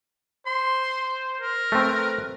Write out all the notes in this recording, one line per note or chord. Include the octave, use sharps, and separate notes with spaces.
C5 C6
A#4
A3 C4 B4